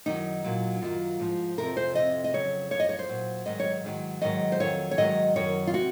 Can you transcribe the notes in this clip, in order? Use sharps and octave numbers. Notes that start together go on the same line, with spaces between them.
F#2 D#3 F#3 D#4
A#2 F#3
F#2 D#3 F#3 F4
G#2 F3
F2 C3 F3 A#4
C5
F2 C3 D#3 F#3 D#5
D#5
F2 C#3 F#3 C#5
F#2 F3 C#5
D#5
C#5
C5
A#2 F#3
G#2 D#3 F#3 D#5
C#5
G#2 D#3 F#3
G#2 D#3 F#3 D#5
C5
F2 D#3 F#3 C#5
C#5
G#2 D#3 F#3 D#5
F#2 D#3 F#3 C#5
F4
C3 F#4